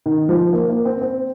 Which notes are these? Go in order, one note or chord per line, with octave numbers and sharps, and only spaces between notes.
D#3
F3
A#3
A#3
C4
C4